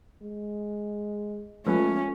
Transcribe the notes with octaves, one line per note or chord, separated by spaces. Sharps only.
G#3
F3 G#3 A3 C#4 B4